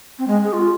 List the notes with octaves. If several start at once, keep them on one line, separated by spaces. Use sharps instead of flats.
C4
G#3
G#4
F4